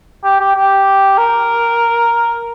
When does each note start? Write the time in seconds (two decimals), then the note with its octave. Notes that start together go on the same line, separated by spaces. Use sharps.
0.24 G4
0.40 G4
0.55 G4
1.18 A#4